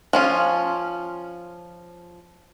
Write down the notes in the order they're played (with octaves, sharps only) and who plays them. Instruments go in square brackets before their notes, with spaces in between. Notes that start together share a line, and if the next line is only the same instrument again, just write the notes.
[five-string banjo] F3 C#4 F4